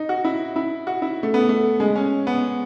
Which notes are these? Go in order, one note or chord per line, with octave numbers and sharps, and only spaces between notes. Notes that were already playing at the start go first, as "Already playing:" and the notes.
Already playing: D#4
F#4
E4
E4
F#4
E4
A3
B3
A3
G#3
C#4
B3